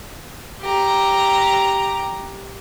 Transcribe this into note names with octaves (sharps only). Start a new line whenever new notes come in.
G4 A#5